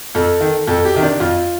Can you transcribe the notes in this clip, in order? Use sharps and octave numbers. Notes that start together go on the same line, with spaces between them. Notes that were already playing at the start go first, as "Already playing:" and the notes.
F2 A4
D#3
F2 A4
G4
C3 D#3
D4
F2 F4